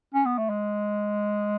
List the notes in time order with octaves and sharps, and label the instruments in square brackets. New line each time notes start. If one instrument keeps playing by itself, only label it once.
[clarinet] C#4
B3
A3
G#3